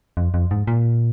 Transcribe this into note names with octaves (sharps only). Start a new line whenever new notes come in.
F2
F2
G#2
A#2